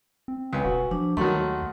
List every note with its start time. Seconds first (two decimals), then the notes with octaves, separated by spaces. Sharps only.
0.28 C4
0.53 C#2 B4 G#5
0.64 E1 F#4
0.91 F3 D4
1.17 D#2 D#3 F#3 A3 F#5 C6